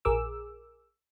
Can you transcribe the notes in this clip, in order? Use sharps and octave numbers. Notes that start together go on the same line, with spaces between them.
A#1 G#4 A#4 D6 E6